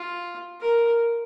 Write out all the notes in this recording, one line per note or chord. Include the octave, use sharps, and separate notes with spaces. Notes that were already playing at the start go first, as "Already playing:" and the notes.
Already playing: F4
A#4